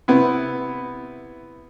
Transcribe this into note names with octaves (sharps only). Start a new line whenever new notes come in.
C3 B3 E4